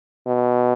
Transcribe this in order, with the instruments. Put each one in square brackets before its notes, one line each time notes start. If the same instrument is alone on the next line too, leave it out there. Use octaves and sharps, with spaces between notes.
[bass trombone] B2